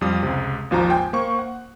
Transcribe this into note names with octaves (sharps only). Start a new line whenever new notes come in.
F2 G3 F4 D#6
C#2 C3
G#1 D#2 F3 F4 C5 A#5
G5 G#5
A#3 C5 C#6
F#5